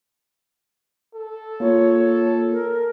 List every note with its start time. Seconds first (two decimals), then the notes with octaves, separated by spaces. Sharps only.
1.15 A4
1.60 A#3 F4 C#5
2.52 A#4